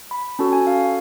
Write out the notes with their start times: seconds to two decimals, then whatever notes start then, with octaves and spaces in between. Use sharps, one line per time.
0.11 B5
0.39 C#4 F#4 A4 A5
0.53 G#5
0.67 F5